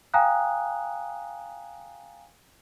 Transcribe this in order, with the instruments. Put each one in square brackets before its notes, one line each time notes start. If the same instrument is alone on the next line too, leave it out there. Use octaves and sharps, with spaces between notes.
[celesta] F5 G5 G#5 A#5 D#6 F#6